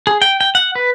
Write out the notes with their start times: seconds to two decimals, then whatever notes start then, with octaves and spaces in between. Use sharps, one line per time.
0.07 G#4
0.22 G5
0.41 G5
0.55 F#5
0.75 B4